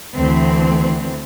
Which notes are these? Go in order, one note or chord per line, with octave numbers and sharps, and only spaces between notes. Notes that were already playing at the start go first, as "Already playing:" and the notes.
D2 E3 C4